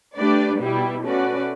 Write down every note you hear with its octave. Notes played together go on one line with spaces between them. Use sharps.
A3 D4 G4 B4 D5
B2 G3 B3 E4 G4
A3 C#4 F#4 B4 D5